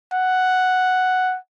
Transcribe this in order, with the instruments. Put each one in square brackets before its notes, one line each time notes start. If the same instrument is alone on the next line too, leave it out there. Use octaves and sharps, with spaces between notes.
[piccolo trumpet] F#5